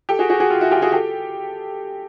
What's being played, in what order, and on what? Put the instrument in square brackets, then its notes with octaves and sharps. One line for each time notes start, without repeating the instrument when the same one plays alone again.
[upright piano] G4 A4
F#4 G#4
F#4 G#4
F#4 G#4
F4
E4 F#4
F4 G4
F#4 G#4
G4 A4